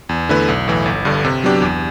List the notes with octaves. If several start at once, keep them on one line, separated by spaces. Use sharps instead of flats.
E2
D3 A3 E4 B4
B1
A2 E3
G1
G2 D3
C3
F#3 B3 D4 G4
E2